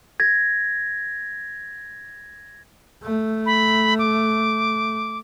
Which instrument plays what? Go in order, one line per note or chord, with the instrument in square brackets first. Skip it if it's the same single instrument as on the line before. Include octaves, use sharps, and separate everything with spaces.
[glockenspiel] G#6 A#6
[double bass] A3
[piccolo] B5
D6